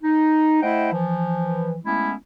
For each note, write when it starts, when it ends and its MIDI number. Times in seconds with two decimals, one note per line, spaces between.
0.03 0.62 63
0.62 0.89 57
0.62 0.89 64
0.62 0.89 72
0.62 0.89 75
0.62 0.89 78
0.62 0.89 79
0.93 1.76 52
0.93 1.76 53
1.85 2.14 56
1.85 2.14 57
1.85 2.14 59
1.85 2.14 61
1.85 2.14 64